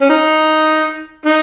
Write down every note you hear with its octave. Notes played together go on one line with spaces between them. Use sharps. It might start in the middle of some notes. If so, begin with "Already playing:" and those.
C#4
D#4
D#4